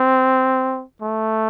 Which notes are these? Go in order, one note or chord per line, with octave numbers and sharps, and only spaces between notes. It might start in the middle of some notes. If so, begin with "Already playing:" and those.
Already playing: C4
A3